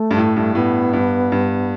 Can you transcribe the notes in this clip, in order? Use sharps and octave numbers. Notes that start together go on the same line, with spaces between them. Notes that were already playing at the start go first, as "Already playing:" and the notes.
Already playing: A3
G2
A2
G2
A2 B3
G2
G2